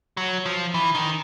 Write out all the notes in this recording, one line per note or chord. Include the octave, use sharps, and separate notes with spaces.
F#3
F3
E3
D#3